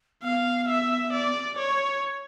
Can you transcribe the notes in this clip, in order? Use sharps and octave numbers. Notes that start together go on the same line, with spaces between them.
B3 F5
E5
D5
C#5